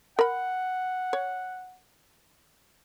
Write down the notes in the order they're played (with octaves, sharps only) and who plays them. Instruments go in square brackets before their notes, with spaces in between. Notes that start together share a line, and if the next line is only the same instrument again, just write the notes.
[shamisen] A#4 B5 [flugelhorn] F#5
[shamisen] C#5